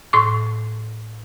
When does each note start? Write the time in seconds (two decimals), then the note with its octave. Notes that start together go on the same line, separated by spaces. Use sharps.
0.13 A2 C6 C#6